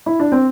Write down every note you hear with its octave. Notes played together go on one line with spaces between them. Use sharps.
E4
D4
C4